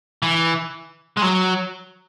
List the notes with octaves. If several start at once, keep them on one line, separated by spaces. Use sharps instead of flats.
E3
G#3
F#3